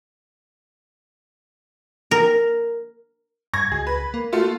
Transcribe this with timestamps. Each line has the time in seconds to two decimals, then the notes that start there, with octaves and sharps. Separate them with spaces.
2.11 A#4
3.53 G2 C#6 G#6 A#6
3.72 C#2 G#4
3.87 B4
4.14 A#3
4.32 A3 F4 F#4